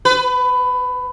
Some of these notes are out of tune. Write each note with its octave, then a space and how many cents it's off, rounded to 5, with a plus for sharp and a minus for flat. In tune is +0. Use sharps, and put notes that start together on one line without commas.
B4 +20